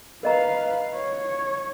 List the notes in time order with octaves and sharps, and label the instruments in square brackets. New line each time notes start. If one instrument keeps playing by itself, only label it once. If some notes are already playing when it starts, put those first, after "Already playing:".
[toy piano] A#4 D#5 A#5 [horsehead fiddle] B4 F5
[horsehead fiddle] C#5